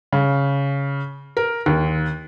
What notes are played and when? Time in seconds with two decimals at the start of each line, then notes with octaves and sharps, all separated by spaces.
0.13 C#3
1.37 A#4
1.66 D#2